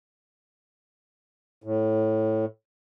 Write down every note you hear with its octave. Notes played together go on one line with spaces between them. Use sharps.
A2